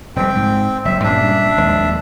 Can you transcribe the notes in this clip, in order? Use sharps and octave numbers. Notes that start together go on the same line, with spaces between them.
F1 F2 G3 C4 G5
G#2
F#1 F#3 E5
G2 A#2 C#4 D4 E5
F1 D#2 G#3